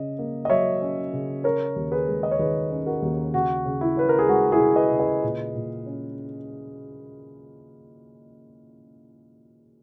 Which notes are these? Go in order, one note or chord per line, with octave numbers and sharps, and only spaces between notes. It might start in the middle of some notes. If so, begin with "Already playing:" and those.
Already playing: C#3 C#4 D#5
A#3
D#5
F#3 C#5 E5
C#4
C#3
C#4 A#4 C#5
D#2
G#4 B4
G#3
D#5
C#5
D#3 G#4 B4
C#4
F#4 A#4
D#2
C#3 F#4
C#3
E4
C#4 B4
A#4
G#4
G#3 F#4
E4 G#4
C#3
B4 D#5
C#3
B4 D#5
A#2
A#2
C#4